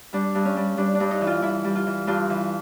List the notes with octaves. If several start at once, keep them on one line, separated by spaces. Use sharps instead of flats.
G3 D4
G2
C#4
G3
G3 D4
D4
G2
D#4
E3
F4
E3 E4
G3
F4
E3
G2 F4
E3